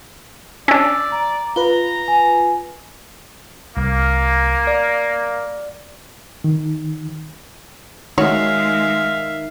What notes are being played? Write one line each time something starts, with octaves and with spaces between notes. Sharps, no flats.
C#4 D4 D5 E6
A#5
F4 B4 A#5 G7
G#5
C2 A#3
D5
D#3
D#3 G#3 D#4 F#4 C#5 E5 F5